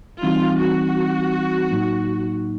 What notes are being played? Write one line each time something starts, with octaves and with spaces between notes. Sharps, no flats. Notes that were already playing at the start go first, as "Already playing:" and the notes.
E3 G3 C4 D#4 F4
F#4
A2 F#3 A#3 D#4